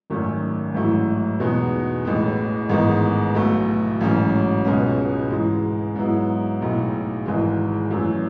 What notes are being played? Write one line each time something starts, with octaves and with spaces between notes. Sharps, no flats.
G#1 F#2 D#3 A3 C#4
A1 G#2 F#3 A3 E4
E2 B2 G#3 B3 D#4
A1 A2 E3 G#3
A1 G#2 D#3 G#3 B3
B1 B2 A3
A1 G#2 F#3 C#4
C#2 B2 G#3 C#4
G#2 E3 G#3
G#2 F#3 B3 E4
B1 A2 G#3 D#4
G#1 G#2 E3 G#3
F#2 E3 A3